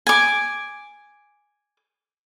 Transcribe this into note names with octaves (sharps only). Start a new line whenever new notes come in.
G#5 D6